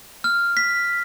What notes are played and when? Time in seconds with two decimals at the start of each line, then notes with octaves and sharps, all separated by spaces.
0.24 F6
0.57 B6